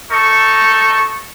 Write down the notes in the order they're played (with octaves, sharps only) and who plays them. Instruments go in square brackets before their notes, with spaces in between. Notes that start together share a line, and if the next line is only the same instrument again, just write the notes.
[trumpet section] D#4 A4 C#6